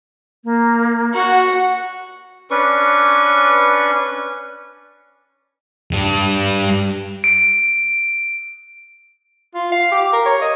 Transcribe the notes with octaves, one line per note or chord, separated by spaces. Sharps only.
A#3
F#4 F#5
C#4 D4 B4 C#6
G2 G3
D7
F4
F5
G4
A#4
C#5
D#5